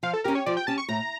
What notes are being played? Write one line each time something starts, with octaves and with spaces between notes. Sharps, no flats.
F3 F5
A4
C#4 G4 A#4
C#5
F3 D5
G5
C#4 G4 A5
C#6
A2 A#5